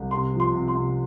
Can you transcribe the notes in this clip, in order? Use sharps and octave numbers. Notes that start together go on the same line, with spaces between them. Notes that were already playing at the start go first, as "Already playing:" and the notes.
Already playing: C2
C3 C6
F3
C6
C3
C6
C3